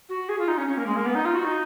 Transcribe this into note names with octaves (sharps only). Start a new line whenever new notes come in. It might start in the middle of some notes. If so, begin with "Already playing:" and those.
F#4
G#4
F4
D#4
C#4
C#4
A#3
G#3
A#3
B3
D#4
F4
F#4
D#4